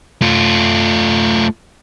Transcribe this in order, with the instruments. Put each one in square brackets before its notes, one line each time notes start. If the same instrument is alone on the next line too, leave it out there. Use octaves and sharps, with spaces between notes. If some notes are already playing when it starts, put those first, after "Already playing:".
[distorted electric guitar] A3 F4